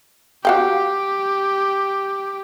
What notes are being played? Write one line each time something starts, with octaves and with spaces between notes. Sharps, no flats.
F#4 G4 F5 G5